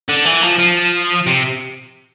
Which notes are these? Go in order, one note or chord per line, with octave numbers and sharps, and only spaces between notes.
D3
E3
F3
F3
C3